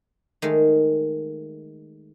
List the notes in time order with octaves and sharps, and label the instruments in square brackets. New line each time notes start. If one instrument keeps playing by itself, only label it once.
[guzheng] D#3 G#3 A3